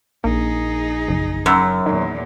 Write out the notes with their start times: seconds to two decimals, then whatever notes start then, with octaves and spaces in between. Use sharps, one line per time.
0.24 A#1 A#3 D#4 G#4
1.08 F#1
1.46 F#2
1.86 E2 A#2 D#3